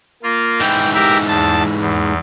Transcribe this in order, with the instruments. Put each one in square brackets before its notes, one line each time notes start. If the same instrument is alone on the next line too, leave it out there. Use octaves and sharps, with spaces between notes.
[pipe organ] A#3 F4
[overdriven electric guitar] G#2 E3 [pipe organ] G5
[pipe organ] G4 A#4 E5
E2 A5
E2